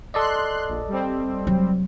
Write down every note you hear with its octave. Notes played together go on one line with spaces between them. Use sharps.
A4 D5 D#5 C6 F#6
A#1
G3 C4
F1 F#3